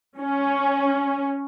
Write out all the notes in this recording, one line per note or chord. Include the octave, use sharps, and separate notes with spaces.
C#4